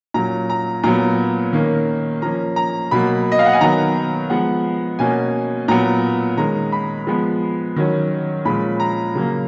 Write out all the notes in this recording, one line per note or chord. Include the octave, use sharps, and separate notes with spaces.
A#2 F#3 C#4 A#5
A#5
A#2 F#3 B3 A#5
D#3 A#3 C#4
F3 A#3 C#4 A#5
A#5
B2 F#3 A#3 B5
D#5
F5
F#5
G#5
D#3 F#3 B3 A#5
F3 G#3 B3 F#5
B2 A#3 C#4 G#5
A#2 F#3 B3 A#5
D#3 G#3 C#4 A#5
B5
F3 G#3 B3
D#3 F#3 C#4
A#2 F3 G#3 C#4 B5
A#5
C#3 F#3 A#3